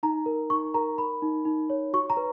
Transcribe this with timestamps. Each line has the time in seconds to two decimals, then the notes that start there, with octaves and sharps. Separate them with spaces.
0.03 D#4 A#5
0.26 A#4
0.50 D#4 C#6
0.74 A#4 A#5
0.98 A#4 B5
1.22 D#4
1.45 D#4
1.70 C#5
1.93 F#4 C#6
2.10 A#5
2.17 B4